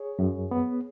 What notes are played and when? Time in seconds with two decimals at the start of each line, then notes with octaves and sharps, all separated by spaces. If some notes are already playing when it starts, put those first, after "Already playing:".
Already playing: G#4 C#5
0.19 F#2
0.51 B3